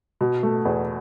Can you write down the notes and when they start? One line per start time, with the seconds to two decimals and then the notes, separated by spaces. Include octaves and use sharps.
0.21 B2
0.43 A3
0.65 E2